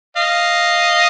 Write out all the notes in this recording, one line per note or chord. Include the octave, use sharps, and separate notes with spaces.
D#5 F5